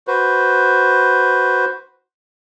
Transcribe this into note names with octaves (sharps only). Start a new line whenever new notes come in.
F#4 B4 C5